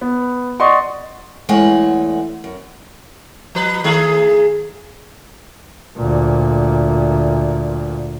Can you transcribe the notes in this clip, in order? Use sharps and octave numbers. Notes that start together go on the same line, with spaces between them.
B3
D5 D#5 F#5 C6 C#6
E2 G#3 A3 C#5 F#5
F#2
F3 B4
D#3 A3 G#4
D2 A#2